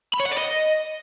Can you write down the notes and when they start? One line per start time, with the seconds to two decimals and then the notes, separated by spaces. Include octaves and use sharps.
0.13 B5
0.19 C#5
0.25 F#5
0.31 D5
0.37 D#5